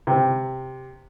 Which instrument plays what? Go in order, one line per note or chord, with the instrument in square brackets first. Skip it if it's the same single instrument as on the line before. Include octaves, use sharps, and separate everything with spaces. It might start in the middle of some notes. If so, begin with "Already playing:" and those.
[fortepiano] C3